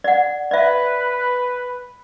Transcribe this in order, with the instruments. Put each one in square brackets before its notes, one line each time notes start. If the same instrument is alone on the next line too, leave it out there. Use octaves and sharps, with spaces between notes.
[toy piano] D5 F#5
[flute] B4 [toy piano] D5 E5